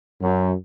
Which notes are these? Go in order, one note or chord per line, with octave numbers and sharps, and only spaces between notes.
F#2